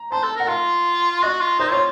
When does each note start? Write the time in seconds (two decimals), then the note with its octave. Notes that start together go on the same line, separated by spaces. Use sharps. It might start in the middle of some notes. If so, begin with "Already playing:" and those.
Already playing: A#5
0.11 C5 A5
0.23 A4
0.36 A#4 F#5
0.48 F4 F5
1.22 F#4 D#5
1.41 F4
1.59 D#4 C5
1.71 F4 C#5